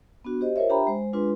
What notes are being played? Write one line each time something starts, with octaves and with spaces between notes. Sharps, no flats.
B3 D4 F#4
G4 C5 D#5
F4 A#4 C5 C#5 E5
D4 G4 E5 G5 A#5 B5
G#3 C5
G#3 D4 F4 G#4 B4 C6